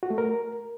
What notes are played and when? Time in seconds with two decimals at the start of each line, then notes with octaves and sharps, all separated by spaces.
0.03 F#4
0.10 A3
0.18 A#4